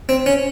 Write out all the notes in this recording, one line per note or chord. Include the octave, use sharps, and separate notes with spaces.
C4
C#4